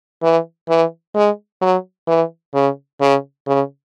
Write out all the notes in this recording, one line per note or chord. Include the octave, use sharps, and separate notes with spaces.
E3
E3
G#3
F#3
E3
C#3
C#3
C#3